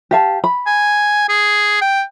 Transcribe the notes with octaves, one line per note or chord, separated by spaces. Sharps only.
G4 F5 A5
B5
G#5
G#4
G5